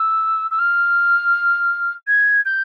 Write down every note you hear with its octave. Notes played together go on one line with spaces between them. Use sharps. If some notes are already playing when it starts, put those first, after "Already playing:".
Already playing: E6
E6
F6
G#6
G6